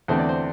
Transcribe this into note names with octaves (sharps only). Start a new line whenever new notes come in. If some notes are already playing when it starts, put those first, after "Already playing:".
E2 D3 A3 C4 C5
D5
C5